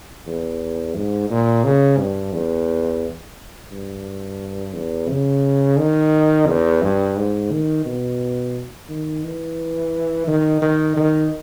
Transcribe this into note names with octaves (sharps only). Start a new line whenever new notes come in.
E2
G#2
A#2
C#3
G2
E2
G2
E2
C#3
D#3
E2
G2
G#2
D#3
B2
D#3
E3
D#3
D#3
D#3